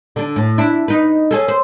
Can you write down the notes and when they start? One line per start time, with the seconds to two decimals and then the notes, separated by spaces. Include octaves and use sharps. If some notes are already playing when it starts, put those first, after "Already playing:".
0.16 D3 D4
0.36 A2
0.58 D4 E4
0.88 D#4 B4
1.31 C#4 G#4 A4
1.48 C5